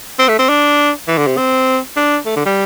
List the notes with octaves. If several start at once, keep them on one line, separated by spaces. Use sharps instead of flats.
C4
A3
C4
D4
E3
D3
C3
C4
D4
A3
D3
G3